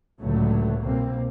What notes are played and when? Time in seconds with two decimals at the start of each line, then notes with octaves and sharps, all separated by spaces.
0.20 C#2 A2 D3 F#3 A3
0.81 C2 B2 A#3 C4